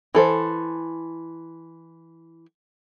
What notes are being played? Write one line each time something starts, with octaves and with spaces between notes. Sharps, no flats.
E3 A4 C5